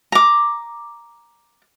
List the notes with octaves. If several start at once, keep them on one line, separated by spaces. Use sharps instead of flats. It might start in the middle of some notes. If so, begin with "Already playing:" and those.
A#5 D6